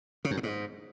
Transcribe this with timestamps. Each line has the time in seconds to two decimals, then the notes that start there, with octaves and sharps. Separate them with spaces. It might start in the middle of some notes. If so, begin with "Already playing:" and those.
0.25 C#3
0.31 F#2
0.37 A2
0.43 G#2